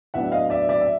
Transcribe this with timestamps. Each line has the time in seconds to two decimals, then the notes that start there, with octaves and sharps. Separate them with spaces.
0.14 A2 F#3 B3 D4 E5 F#5
0.32 D#5 F5
0.50 D5 E5
0.69 D5 E5
0.81 E5